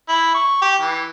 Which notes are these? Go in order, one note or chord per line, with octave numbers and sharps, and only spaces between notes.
E4
C#6
G4
E3